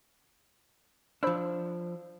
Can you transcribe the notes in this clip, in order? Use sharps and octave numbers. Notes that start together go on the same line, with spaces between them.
F3 D4 C5 B5 E6